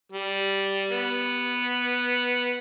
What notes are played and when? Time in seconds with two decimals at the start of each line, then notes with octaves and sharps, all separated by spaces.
0.12 G3
0.91 B3